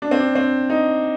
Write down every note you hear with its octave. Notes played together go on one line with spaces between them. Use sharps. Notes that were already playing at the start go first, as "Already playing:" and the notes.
D4
C4
D4
C4
D#4